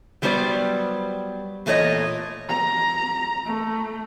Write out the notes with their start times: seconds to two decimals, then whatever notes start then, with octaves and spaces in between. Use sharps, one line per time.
0.22 F#3 G3 B3 D4 C5 D5
1.66 E2 A#2 A3 A#3 C#5 D#5
2.49 A#5
3.46 A3